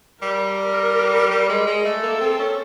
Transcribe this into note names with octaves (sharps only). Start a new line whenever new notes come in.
G3 A#4
G3
G#3
G#3
A3 A4
A#3
C4
C#4